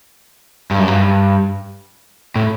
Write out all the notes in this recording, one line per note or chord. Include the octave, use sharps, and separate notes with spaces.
G2
F#2
G2
A2